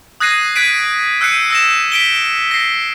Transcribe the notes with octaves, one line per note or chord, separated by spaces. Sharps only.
D#6 F#6 G#6 A#6 C7 D#7
F#6 G#6 B6 D7 D#7
E6 F#6 G6 C7 C#7 D#7
E6 A#6 E7
B6 D7 G7
A#6 C7